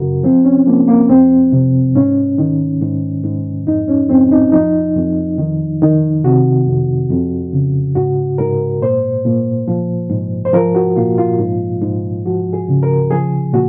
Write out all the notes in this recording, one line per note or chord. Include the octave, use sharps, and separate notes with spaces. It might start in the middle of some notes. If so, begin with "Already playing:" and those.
Already playing: F#2 C#3 F#4 A#4
F3 C4
C#4
F3 A#3
A#3
F2 C4
C3
G#2 C#4
D#3
G#2
G#2
F2 D#4
C#4
F2 C4
D#4
F3 D#4
F2
D#3
D#3
C3 F#4
F2
F2
C#3
G#2 F#4
G#2 A#4
A#2 C5
A#2
F3
G#2
C5
F3 A#4
F#4
A#2 F4
F4
G#2
G#2
F3 F#4
G#4
C#3
A#4
F3 G#4
A#2 F#4